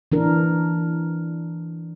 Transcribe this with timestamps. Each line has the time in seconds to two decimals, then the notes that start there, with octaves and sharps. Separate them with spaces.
0.12 E3 D4 A#4